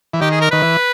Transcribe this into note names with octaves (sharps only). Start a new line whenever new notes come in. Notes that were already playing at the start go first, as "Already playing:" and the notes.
E3
D#3 G4
G#4
A#4
D#3 B4
E3